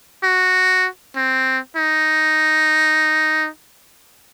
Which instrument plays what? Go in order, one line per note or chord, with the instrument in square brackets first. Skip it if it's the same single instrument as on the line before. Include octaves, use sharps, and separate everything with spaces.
[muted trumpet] F#4
C4
D#4